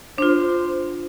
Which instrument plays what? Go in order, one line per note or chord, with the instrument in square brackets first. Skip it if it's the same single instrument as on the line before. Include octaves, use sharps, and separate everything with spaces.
[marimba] D4 F4 [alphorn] C5